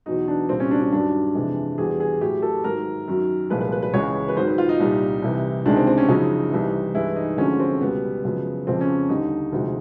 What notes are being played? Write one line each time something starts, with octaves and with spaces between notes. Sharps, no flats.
E2 B2 F#3 D#4
D4
C2 A#2 G3 C4
C#4
D4
D4
G2 D#3 F#3 D4
F2 C3 E3 G#3
E2 B2 G3 G#4
G#4
A2 F#3 G4
A4
G#2 D#3 F#3 A#4
F#2 D#3 F#3
C2 A#2 F3 G#3 B4
B4
B4
B4
C#2 C#3 E3 G#3 C#5
B4
G#2 D#3 F#3 C5
B4
F4
D#4
C2 A#2 G3
C2 C3 E3
C#2 C3 D#3 G#3 D4
C4
C4
C#4
F#2 C#3 F3 G#3 D#4
C2 C3 E3
G2 E3 G#3 E4
D#4
D2 D3 F3 G#3 C#4
C4
C#2 B2 G3 B3
F#2 C#3 F3 G#3
F2 C#3 F3 G#3 C4
C#4
D#2 D3 G3 D#4
D2 C3 F3 G#3